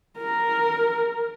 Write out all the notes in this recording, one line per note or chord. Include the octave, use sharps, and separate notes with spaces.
A#4